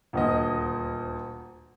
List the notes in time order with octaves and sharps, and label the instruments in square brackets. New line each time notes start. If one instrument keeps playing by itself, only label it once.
[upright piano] D#1 D2 D#5